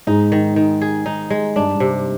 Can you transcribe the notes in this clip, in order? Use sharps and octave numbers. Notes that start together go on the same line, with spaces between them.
G#2 D#4
D#3
D#3
G#4
D#4
G#3
G2 D4
G2
C3